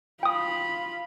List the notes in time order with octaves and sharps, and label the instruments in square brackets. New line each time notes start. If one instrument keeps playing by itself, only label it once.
[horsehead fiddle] F4 B5 [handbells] G5 D#6